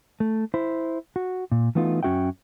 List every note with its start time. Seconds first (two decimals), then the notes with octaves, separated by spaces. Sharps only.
0.20 A3
0.54 E4 C5
1.16 F#4
1.52 A#2
1.75 E3 A3 B3 D#4 F4
2.03 F#2 C#4 F#4 E5 G5